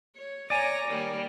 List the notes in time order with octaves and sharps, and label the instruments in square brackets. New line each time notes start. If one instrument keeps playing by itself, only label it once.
[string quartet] C#5
[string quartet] C#5 A#5 A#6 [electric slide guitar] D5 G#5
[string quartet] D#3 G3 A#3